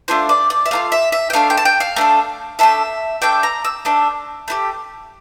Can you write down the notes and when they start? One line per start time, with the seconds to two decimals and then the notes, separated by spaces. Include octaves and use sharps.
0.08 A3 D4 F4 C5
0.29 D5
0.50 D5
0.66 E5
0.71 A3 D4 F4 F5
0.92 E5
1.12 E5
1.30 G5
1.33 A3 D4 F4 F5
1.50 G5
1.57 A5
1.65 G5
1.80 F5
1.96 A3 D4 A4
2.59 A3 D4 A4 E5
3.22 A3 D4 A4 G5
3.43 A#5
3.64 E6
3.85 A3 D4 A4
4.48 A3 E4 G4